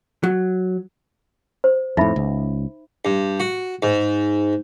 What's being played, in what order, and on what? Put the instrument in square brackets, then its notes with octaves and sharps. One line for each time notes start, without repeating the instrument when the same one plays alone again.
[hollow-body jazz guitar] F#3
[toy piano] C5
[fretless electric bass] F2 A2 [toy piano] D#4 E5 B5
[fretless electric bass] C#2
[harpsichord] G2
F#4
G#2